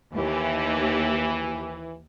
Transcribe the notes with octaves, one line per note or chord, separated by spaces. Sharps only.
D#2 E3 G4